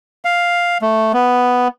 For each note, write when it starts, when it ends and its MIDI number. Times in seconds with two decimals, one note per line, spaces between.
0.25 0.78 77
0.82 1.12 57
1.13 1.68 59